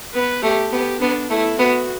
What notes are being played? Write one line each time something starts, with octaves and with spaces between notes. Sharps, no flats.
B3 B4
A3 G4
B3 G4
B3 D4
A3 E4
B3 F#4